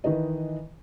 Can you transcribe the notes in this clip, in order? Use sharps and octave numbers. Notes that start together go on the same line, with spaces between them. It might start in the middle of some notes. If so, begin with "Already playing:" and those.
D#3 E3 B4 D#5